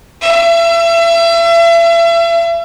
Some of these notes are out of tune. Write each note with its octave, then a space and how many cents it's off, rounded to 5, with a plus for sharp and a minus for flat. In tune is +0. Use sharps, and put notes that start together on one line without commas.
E5 +35